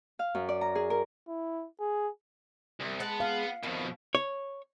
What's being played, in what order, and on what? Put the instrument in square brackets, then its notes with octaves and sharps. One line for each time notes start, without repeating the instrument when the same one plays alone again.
[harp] F5
F#2
D5
A#5
G#4
A#4
[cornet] E4
G#4
[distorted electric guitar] C2
[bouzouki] G#3 B4 A5 [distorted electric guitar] B3 F#5
[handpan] F5
[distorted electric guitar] F2 B2 [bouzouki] D#3
[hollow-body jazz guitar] C#5